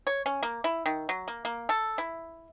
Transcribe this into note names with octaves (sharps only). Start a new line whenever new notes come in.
C#5
C#4
A#3
E4
D#3
F#3
A#3
A#3
A4
E4